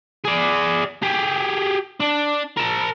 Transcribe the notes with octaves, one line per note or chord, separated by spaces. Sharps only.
G#4 D5
G4 G#4
D4
A#4 A5